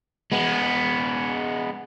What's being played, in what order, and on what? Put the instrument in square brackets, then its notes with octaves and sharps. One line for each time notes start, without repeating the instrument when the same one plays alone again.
[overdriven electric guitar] G#3 B3